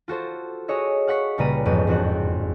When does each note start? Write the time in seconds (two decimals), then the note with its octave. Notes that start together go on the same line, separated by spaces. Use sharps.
0.08 F4 F#4 A4 C5
0.68 F#4 G#4 C#5 D#5 E5
1.07 F5 F#5 C#6 B6 C7
1.38 C#2 A#2 G3 B4 A#5 D#7
1.65 A1 F2 G#2 B3 D#7
1.87 E1 F2 C4 F#4 F#6